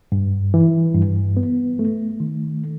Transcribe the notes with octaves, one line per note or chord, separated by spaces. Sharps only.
G2
E3
G2
B3
A3
D#3